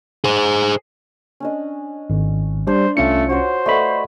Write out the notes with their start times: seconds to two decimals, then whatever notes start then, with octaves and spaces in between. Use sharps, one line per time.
0.24 G#4 C5
1.40 C#4 D4 D#5
2.10 G#1
2.67 G3 D4 C5
2.97 C2 A3 C#4 F4 C#7
3.29 F#4 C5 C#5
3.66 A3 B4 D5 D#5 F#5 B5